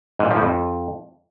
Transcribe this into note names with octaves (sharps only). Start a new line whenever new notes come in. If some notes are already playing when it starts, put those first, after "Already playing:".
G#2
A#2
F3
A2
F2